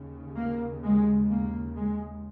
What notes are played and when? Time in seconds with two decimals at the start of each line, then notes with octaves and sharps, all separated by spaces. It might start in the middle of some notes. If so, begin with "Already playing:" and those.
Already playing: D#2 C#3
0.36 A#3
0.84 G#3
1.30 A#3
1.76 G#3